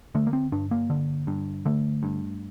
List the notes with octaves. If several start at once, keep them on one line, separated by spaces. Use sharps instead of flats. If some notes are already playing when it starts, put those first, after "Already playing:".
D3 A3
A#3
C4
G2 D4
A#3
D3
G2
D3 A3
G2